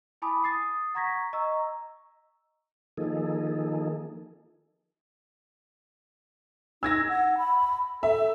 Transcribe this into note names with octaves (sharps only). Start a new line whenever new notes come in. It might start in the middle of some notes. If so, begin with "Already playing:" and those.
E4 G#5 A5 B5 D6 D#6
D#6 A6 C7
F#5 A#5 C#6 G#6 A#6 B6
D#5 A#5 C#6 E6
D#3 F3 A#3 D#4 G#4 A4
D#4 E6 G#6 A#6
F#5
B5
A4 E5